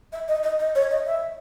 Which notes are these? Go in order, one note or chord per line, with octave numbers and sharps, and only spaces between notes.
E5
D#5
D#5
D#5
C#5
D#5
E5